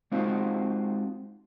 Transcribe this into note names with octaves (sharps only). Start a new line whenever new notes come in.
G#3 C4 D#4 F4 F#4 C5